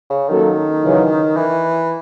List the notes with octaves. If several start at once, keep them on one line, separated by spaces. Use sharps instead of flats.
C#3
D#3 F#3 A#3 C#4 F#4 A4
F#2 C#3 E3
E3